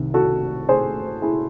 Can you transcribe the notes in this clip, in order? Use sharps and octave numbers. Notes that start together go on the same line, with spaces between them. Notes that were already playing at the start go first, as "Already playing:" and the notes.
Already playing: C2 C3 D#3
F#4 A4
G#4 C5
E4 G#4